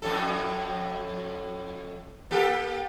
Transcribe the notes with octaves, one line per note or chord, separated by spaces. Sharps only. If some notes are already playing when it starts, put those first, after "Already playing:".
F2 A2 A4
A#3 G4 A4